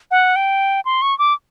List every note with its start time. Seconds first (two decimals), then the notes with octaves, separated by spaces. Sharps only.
0.11 F#5
0.36 G5
0.85 C6
1.02 C#6
1.19 D6